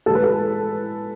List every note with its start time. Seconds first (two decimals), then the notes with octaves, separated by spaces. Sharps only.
0.06 A2 A4
0.10 G#3 B4
0.24 A4